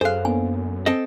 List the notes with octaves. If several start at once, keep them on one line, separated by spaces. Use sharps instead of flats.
F#2 G#4 A4 C5 F5 F#6
A#3 B3 D4 G#5
C4 A4 D#5